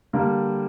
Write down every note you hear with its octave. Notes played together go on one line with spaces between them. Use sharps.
D3 G3 A#3